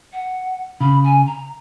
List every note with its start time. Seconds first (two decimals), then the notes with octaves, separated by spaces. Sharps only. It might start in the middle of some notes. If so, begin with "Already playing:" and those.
0.12 F#5
0.80 C#3 B5
1.04 G#5
1.26 A#5